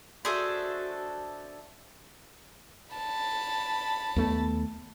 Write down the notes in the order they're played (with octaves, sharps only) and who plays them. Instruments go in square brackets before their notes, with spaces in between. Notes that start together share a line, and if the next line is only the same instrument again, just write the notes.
[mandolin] D4 A4 E5 [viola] F#4 [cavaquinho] G#4 C5
[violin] A5 B5
[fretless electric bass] D#2 A3 B3